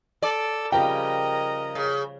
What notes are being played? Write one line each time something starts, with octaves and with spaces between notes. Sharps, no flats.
A4 D5
C#3 F3 G3 A#4 D#5 G5
C#3